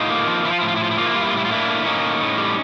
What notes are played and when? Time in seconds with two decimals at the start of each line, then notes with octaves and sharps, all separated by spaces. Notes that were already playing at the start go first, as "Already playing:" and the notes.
Already playing: A2 D#4 F4
0.10 A#3
0.28 F3
0.45 F3 E4
0.52 F4
0.60 A2 E4
0.68 F4
0.76 E4
0.81 F3 F4
0.91 E4
0.98 A#3 F4
1.06 E4
1.14 G3 F4
1.21 E4
1.29 F4
1.33 A2 E4
1.45 F4
1.50 A#3 D4 E4
1.68 A2
1.85 A#3 C#4 D#4
2.02 A2
2.20 A2
2.38 G3